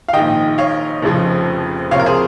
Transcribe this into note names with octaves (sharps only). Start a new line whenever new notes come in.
F5
A#1 G#2 D#3 D#5 G5
C#5 F5
F1 F2 C#3 F3
C#2 C3 F3 C#5 F5
A#4
G#4 C5